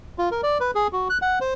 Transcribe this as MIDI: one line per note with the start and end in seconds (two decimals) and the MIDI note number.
0.18 0.29 65
0.31 0.41 70
0.43 0.58 74
0.60 0.71 71
0.75 0.87 68
0.93 1.08 66
1.10 1.18 90
1.22 1.39 78
1.41 1.54 72